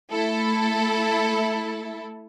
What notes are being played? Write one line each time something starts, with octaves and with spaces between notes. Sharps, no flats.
A3 E4 A4